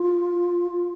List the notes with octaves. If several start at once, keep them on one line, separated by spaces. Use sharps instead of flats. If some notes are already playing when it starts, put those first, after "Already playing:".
Already playing: F4
F4